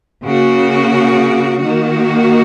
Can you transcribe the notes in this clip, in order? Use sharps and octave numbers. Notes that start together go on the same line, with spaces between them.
C#3 A#3 F#4
D#3 A#3 F#4